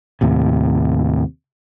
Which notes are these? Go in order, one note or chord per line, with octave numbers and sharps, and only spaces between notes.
D#2 A2 C3